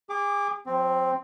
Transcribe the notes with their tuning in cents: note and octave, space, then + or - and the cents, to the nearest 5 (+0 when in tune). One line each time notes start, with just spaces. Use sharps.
G#4 -35 D6 +0
F#3 -45 C4 +0